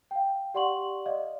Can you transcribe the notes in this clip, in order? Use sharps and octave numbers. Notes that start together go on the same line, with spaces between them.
F5 G5
G4 D5 F#5 C6 C#6 F#7
D5 D#5 F5